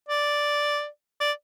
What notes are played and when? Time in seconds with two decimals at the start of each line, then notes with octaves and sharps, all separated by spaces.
0.09 D5
1.21 D5